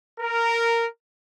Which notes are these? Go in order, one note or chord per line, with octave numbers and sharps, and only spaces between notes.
A#4